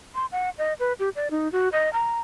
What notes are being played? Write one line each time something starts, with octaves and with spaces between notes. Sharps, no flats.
C6
F#5
D#5
B4
G4
D5
D#4
F#4
D#5
A#5